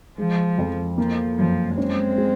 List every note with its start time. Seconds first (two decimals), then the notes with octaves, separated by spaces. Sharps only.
0.18 F3 G#3
0.58 F2
0.98 F3 A#3
1.38 F#2 F3
1.77 G#3 C4 C#4
2.18 G#4